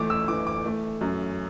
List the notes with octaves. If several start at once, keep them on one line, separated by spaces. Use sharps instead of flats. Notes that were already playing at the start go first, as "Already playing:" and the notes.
Already playing: G1 E3 A3 D6
E6
E3 D6
D6
A3
F#2